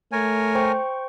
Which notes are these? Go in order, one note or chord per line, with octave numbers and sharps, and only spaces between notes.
A3 A#4 C#5 G#5
C5 G5 C#6